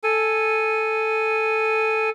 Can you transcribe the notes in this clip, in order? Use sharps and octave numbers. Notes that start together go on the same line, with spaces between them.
A4 G#5